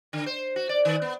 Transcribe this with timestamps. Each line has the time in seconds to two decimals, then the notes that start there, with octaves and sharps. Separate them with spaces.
0.13 D3
0.26 C5
0.56 F#4
0.69 D5
0.85 D#3
1.02 B3